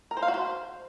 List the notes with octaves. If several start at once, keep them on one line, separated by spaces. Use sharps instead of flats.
A#4
C5
F5
F#4
C5